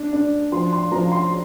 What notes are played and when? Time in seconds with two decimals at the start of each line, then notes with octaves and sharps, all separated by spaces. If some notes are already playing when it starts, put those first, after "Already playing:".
Already playing: D4
0.13 D4
0.52 F3 C6
0.73 C6
0.92 F3 A#5
1.12 C6